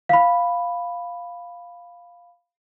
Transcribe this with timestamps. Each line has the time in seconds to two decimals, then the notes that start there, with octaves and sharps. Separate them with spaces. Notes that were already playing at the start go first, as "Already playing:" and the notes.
0.09 F5 B5